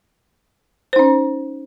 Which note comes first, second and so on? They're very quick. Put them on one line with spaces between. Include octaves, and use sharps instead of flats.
C5 D#4 C#4